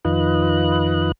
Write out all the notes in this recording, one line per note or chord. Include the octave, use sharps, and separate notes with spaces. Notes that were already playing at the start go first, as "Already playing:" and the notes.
F2 D#3 F4 B4 D#5 F#6